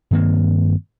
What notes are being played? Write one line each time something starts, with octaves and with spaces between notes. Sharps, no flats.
G2 D#3 A#3 C4